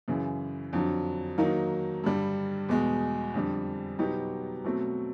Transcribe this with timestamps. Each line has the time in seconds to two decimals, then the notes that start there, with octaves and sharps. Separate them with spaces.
0.08 F#2 C#3 E3
0.73 F2 D3 F#3
1.38 D#3 F#3 A#3 D#4
2.04 G2 D3 G3
2.69 E2 B2 G#3
3.34 F2 D3 G3
3.99 B2 F#3 B3 D#4 G4
4.64 B2 F#3 A3 C4